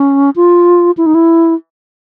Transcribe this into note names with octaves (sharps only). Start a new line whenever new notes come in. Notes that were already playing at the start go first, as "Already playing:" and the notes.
Already playing: C#4
F4
E4
D#4
E4